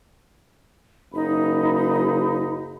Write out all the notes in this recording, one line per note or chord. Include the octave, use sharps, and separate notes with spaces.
F#1 D#4 B5